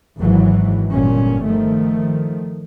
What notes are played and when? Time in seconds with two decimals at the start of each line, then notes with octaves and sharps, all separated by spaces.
0.18 G#1 G#2 E3 F#3
0.91 G1 A#2 C#4
1.47 D#3 F3 A3